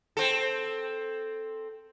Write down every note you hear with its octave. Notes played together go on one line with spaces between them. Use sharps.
C4 A4